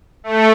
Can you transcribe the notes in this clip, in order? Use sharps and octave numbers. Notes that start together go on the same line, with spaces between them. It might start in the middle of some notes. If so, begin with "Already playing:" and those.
A3